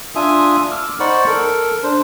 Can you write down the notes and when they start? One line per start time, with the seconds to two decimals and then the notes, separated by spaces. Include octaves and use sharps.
0.15 D4 F4 E5 G#5 D#6
0.71 D6 E6 F6
1.00 D#4 C5 D5 F#5 B5 C#6
1.27 A4 A#4
1.83 D4 C5